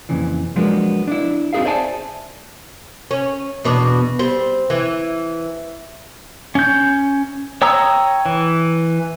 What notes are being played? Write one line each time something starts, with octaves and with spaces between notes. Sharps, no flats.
F2 A#2 C#3 E3
F3 F#3 G#3 A#3 B3 D4
D4 E4
C4 D#4 F#4 G#4 E5 F5
C5 D5 E5 G#5 A5
C#4
E2 B2 D4
G3 C4
E3
C#4 G6
C#5 G5 A#5 D#6 E6
E3